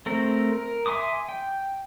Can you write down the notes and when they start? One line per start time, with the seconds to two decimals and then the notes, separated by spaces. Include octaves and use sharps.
0.06 A3 C4 A#4
0.53 A#4
0.86 E5 G#5 C6 D6 D#6
1.29 G5